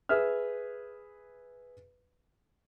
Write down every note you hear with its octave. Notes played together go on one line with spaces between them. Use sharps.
G#4 B4 E5 F6